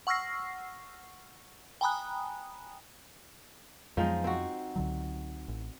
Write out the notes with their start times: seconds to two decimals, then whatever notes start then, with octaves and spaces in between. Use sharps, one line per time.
0.07 F#5 C#6 E6 F6 A#6 C7
1.81 G5 G#5 A#5 B5 D#6 F#6
3.97 F2 F3 F#3 G#3 B3 D#4
4.24 C4 F#4
4.76 C#2 D3 F#3
5.48 A1